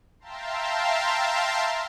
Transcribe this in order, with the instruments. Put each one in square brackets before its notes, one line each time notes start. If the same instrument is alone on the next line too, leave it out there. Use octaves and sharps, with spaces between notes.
[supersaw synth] E5 F5 G5 A5 A#5 C6